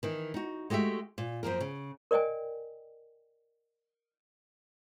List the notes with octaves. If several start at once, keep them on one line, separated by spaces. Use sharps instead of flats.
D#3 E3
D#4 F#4
G#3 A3 F#4 G4 E5
A#2
F#2 F3 A#3 A#4
C#3
A#4 D5 D#5 G5 G#5